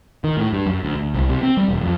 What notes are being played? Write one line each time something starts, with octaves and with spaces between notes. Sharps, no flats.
D#3
A2
G2
F#2
D2
D2
C2
C3
C4
G3
E1
F2